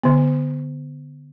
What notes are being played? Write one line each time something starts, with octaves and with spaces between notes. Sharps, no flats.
D3 B3